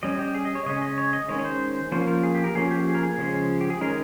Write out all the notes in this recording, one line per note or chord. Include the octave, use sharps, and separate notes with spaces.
G3 C#4 D#5
G4
G#4
D#5
C#5
C#3 G#3 C#4 D#5
D#5
C#5
D#5
D#3 G#3 C#4 C#5
C#5
C5
F3 A#3 C#4 C5
A#4
G#4
G4
A#4
F3 A#3 C#4 G#4
G4
G#4
A#4
G#4
C#3 F3 G#3 C#4
G4
G#4
D#3 G#3 C#4 A#4